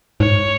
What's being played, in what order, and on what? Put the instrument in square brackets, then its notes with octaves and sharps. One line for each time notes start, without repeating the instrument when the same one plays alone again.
[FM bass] G#2 [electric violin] C#5